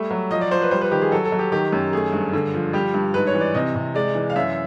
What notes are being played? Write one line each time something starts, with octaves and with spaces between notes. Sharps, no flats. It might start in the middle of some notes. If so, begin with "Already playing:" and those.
Already playing: G3 A3 E5
F#3
F3 D#5
D5
F3 C5
B4
G3 C5
B4
D#3 G4
G#4
F#3 A4
A4
F#3
G4
D#3 G4
F#2
A3 G#4
G2
D3
F3
G3 G4
G2
G#2 B4
C#5
E3
D5
C3 D#5
C3
G#3 D5
E3
F5
F#2 E5